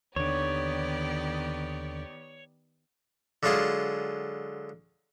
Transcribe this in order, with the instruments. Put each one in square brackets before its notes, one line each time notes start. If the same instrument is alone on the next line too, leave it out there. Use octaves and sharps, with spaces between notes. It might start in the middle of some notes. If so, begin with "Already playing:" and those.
[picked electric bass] D#2 D3 [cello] D#3 B3 [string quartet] G4 D5 [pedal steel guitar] C#5
[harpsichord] D3 F#3 G#3 F4 G#4 A5